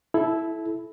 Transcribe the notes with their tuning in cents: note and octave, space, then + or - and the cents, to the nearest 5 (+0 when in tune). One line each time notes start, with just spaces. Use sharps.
E4 +0 A4 -25